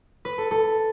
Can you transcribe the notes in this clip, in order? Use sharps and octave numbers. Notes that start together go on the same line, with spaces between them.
B4
A4
A4